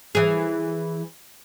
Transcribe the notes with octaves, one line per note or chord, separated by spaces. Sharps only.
E3 G#4